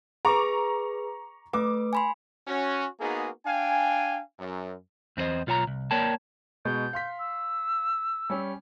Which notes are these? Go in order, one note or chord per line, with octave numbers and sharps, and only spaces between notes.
G#4 B4 A#5 C#6 D6
A3 B4 D6
G#5 B5 C6
C#4 F#4
A#3 B3 D#4 F#4 G#4
D4 F5 G5 G#5
F#2
E2 C4 D4 C5 D#5
B1 F4 C#5 G#5 A#5
C2
A#3 A#4 C#5 D5 G5 A5
B2 G#3 C#6 G6
F5 C6 B6
E6
G3 C#4